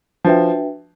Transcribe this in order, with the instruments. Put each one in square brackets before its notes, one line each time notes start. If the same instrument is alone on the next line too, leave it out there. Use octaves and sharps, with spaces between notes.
[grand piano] F3 [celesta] D4 F#4 B4 E5 G5